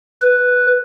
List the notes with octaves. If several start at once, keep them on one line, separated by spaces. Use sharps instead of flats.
B4